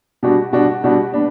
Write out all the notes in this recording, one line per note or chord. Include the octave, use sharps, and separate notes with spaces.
B2 G3 D4 F#4
B2 G3 D4 F#4
B2 G3 D4 F#4
B3 D4